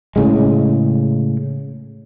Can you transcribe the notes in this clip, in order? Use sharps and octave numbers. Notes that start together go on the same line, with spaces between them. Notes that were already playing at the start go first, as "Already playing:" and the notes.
A2 C#3 G#3